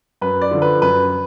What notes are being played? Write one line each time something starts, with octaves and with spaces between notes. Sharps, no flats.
F#2 B4
D5
D3 F3
B4
F#2 B4